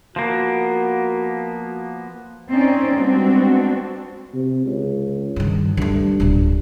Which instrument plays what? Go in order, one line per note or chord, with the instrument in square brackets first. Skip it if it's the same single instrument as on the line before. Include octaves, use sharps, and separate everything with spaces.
[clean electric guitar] F3 A#3 B3 [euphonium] F#4
[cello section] C4 C#4 D#4 C5 D5
G3 G#3 B3 C4 D4 F#4
[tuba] C3
C#2
[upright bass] G2 D#3
[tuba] G2 [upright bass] G3 A3
[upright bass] D1 A#2